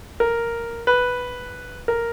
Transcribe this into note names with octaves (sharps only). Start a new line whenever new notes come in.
A#4
B4
A#4